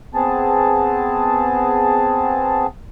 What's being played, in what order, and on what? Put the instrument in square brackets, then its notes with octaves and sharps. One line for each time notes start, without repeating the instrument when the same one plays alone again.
[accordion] B3 C4 G#4 A5